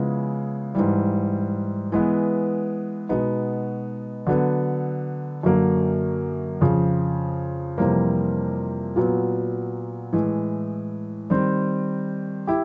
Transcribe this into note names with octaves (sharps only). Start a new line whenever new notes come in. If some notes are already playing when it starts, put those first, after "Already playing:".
Already playing: C#3 F3 G#3 B3 E4
G#2 E3 G3
E3 G#3 B3
B2 G#3 B3 D#4
D3 F#3 B3
F#2 D3 F#3 A#3
F2 C#3 F3
F2 C3 E3 G3 A#3
A#2 F#3 B3
A2 E3 G#3
D#3 G3 C4
E4 G4